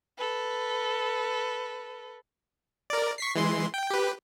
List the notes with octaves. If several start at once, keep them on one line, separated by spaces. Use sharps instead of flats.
A4 B4
A#4 D5
C#6 B6 C7
E3 G#3 C6
G5
G4 B4